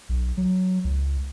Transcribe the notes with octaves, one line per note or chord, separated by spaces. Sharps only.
B1
F#3
C#2